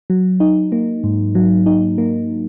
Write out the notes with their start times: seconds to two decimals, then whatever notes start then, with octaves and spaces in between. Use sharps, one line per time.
0.10 F#3
0.40 D#4
0.72 A#3
1.04 G#2
1.35 F#3
1.66 D#4
1.98 A#3